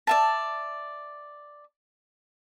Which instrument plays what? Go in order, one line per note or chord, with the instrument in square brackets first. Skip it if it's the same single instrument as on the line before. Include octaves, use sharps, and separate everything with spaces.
[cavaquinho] D5 E5 A5